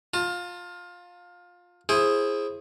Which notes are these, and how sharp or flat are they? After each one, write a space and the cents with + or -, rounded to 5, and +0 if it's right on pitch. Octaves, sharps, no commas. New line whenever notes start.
F4 +20 A5 +45
E4 +15 G#4 +0 C5 +25